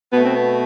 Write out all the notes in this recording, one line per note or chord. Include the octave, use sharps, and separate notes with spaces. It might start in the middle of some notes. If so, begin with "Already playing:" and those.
B2 A3 B3
C4
B3